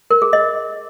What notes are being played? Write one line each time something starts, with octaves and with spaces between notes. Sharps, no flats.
A#4
G#4
D#5